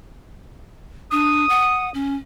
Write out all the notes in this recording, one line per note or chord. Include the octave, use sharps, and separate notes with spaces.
D4 D#6
F#5
C#4